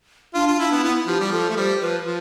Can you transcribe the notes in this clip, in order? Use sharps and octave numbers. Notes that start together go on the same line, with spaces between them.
D4 F4
F4
D4 E4
B3
B3 E4
F3 G4
G3
F3 A4
A3
G3 C5
F3 B4
F3